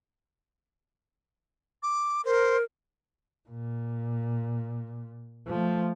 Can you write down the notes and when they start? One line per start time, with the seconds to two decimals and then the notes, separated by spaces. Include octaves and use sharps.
1.83 D6
2.25 A#4 C5
3.49 A#2
5.47 F3 A3